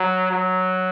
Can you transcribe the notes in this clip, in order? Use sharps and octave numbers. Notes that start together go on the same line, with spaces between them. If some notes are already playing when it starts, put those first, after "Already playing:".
Already playing: F#3
F#3